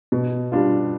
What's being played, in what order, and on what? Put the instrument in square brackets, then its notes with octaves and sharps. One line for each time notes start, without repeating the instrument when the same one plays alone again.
[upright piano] B2
G3 D4 F4